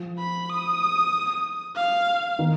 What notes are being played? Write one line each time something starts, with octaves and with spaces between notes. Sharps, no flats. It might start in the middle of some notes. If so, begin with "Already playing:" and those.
Already playing: F3
B5
D#6
F5
D#3